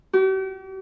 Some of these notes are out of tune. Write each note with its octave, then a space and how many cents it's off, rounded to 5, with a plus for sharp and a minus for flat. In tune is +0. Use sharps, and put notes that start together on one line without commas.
G4 -45